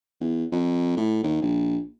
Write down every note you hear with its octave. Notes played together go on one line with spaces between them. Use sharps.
E2
F2
A2
D#2
A#1